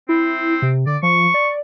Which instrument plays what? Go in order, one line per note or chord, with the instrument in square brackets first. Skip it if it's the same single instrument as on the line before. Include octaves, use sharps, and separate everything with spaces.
[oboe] C4 [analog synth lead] E4
[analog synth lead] C3
[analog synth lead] D3 [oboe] D5
[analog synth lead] F3 [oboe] C#6
[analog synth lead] D5